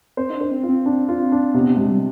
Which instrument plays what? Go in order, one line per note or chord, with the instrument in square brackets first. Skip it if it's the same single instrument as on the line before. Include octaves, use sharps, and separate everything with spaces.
[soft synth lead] C4 [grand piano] C5
[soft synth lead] D#4
D4
[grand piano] C5
[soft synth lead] C4
[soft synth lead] C4 [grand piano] F4
[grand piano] D4
F4
D4
[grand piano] C3 [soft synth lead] B3
[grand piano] C3 [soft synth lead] G#3
[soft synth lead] G3